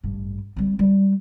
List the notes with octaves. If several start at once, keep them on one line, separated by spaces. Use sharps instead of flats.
A1 G2
G3 C4
G3